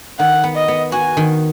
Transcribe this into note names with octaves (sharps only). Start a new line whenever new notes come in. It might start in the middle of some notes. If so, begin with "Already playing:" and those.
D#3 F#5
B3
D#5
B3
F#4 G#5
D#3